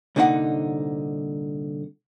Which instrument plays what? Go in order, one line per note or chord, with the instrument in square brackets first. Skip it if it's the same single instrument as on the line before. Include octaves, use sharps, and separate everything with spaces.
[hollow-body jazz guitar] C2 A#2 D3 D#4 F#4 F#5